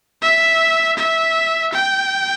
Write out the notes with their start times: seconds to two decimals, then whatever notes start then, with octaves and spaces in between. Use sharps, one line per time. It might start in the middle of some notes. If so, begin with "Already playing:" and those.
0.22 E5
0.97 E5
1.73 G5